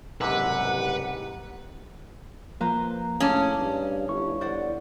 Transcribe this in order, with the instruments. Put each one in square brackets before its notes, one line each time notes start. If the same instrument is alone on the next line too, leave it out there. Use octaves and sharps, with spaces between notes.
[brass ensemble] F#1 C2 G4 [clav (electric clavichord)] G#2 C3 [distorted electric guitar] B4 [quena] F#5
[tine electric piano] F3 A#3 [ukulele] B4 C5 A#5
[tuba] A2 [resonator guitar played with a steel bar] C#4 [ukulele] G#4 C#5 A5 [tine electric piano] F5 D6
[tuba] G2
[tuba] G1 [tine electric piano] E4 C#6
[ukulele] C5 D5 F#5